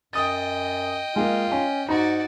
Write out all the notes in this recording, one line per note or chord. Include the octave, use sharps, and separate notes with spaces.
F#2 D#5 G5 D#6 A6
G#3 A#3 F4
C#4
G#2 D#4 F#4 D5 A#5